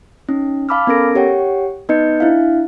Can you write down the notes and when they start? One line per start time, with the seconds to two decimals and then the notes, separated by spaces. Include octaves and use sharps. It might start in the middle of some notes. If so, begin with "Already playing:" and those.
0.29 C#4 D#4
0.69 F5 A5 B5 D6 E6 F6
0.87 B3 C#4 A4 A#4 A#6 D7
1.15 G4 C#5 F#5 G5
1.89 B3 D#4 B4 D#5 G6 C#7
2.20 D4 E4 E5 F5